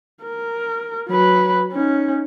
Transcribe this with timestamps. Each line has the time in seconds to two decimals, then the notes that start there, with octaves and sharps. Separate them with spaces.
0.23 A#4
1.09 F#3 B4
1.72 C#4 D#4